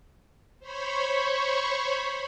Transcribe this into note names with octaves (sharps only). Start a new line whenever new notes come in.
C5 C#5 B5 C#6